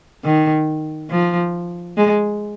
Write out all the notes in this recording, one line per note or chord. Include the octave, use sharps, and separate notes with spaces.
D#3
F3
G#3